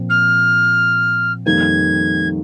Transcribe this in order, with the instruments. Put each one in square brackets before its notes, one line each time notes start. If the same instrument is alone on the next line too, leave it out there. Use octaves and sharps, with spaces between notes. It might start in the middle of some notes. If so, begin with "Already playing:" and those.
Already playing: [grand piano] A#2 F3 C4
[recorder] F6
[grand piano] F2 D#3 G3 A#3 [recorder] G#6